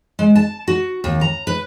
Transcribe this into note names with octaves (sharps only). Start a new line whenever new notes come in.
G#3
A5
F#4
D#2
A#5
B4